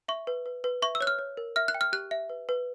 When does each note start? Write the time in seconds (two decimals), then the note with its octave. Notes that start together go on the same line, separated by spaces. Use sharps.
0.08 E5 C#6
0.27 B4
0.46 B4
0.64 B4
0.82 E5 C#6
0.95 E6
1.01 C#5 F#6
1.07 F6
1.19 C#5
1.37 A#4
1.56 E5 F6
1.68 F#6
1.74 G5
1.81 F6
1.93 G4 F#6
2.11 E5
2.30 B4
2.49 B4